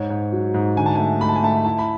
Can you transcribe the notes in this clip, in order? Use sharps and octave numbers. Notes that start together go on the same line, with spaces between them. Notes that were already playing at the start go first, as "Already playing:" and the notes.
Already playing: G#2 C#5
G#2
F#3
G#2
D3 G#5
A5
A3 G#5
A3 B5
A5
G#5
A3 A5
E4 A5
B5